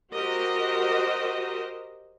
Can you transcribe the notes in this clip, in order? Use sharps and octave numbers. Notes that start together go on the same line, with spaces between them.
F#4 G4 A#4 C5 D#5